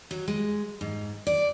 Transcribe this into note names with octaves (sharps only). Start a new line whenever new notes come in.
F#3
G#3
G#2
D5